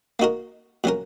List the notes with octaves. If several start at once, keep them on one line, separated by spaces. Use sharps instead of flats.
A#3 D#4 F#4 A#4
A#2 F#3 C#4 A#4